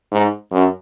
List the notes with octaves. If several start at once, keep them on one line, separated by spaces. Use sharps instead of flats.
G#2
F#2